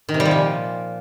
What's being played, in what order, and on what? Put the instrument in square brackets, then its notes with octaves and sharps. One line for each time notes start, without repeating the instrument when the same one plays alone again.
[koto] D#3
C3
G3
F3
A#2